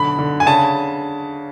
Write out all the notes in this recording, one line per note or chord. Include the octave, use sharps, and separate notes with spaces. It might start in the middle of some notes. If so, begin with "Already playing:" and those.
Already playing: B2 D3 F#3 B5
D3
G#5
C#3 A5